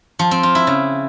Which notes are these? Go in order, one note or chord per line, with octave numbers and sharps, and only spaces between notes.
F3
C4
F4
E4
C#3